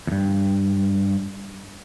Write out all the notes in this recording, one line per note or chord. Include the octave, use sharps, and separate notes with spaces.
E2 G2